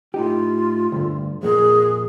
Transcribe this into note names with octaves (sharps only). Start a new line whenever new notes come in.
A2 D#4 F4 G4
D2 G2 D3
F2 A#2 A#3 G#4